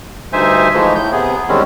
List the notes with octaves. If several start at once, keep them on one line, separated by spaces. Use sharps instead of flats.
D2 G2 D#4 C5 E5 G#5
E3 F3 G#3 A3 D#4
A2 G6
C3 B3 G#4
E2 D#3 G3 G#3 C4 C#4